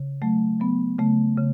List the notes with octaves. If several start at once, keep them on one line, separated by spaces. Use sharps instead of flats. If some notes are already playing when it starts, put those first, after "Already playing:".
Already playing: C#3
F#3 A3
F#3 B3
C#3 A3
C#3